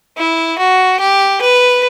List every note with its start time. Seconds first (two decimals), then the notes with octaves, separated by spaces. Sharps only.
0.17 E4
0.58 F#4
1.00 G4
1.41 B4